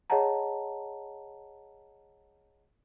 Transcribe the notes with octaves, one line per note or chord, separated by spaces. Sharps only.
G#4 C#5 D#5 F#5 A5 A#5